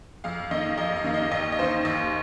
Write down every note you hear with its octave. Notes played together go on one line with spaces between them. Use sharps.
F2 F5
D#3 A#3 D#5
F2 D#5
F5
D#3 A#3
D#5
D#2 D#5
D#5
D#3 A#3 C5
D#2